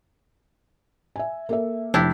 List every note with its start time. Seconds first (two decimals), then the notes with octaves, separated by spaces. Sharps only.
1.16 E5 G#5
1.49 A#3 A4 E5
1.94 F1 D4 E4 G4